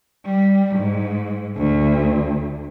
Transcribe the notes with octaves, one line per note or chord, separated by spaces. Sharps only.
G3
G#2
D2